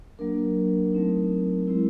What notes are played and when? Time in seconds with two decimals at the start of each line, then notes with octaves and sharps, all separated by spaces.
0.19 F#3 A#3 D4 A#4
0.93 F#3 A3 C4 D#4
1.67 G#3 C4 E4